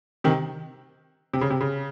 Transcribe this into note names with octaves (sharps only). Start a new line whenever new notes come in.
C3 D#3
C3
C#3
C3
C#3